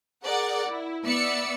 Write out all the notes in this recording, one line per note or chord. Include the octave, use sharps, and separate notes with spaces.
G#4 A#4 D5 F#5
E4
B3 D5 E5 E6 C#7